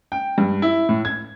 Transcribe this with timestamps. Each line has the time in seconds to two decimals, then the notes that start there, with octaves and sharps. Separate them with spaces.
0.12 G5
0.38 G2
0.62 E4
0.89 A2
1.05 G#6